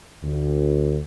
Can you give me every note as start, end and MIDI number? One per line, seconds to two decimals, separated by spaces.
0.24 0.99 38